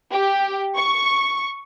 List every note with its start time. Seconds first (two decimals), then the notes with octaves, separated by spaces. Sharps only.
0.13 G4
0.76 C#6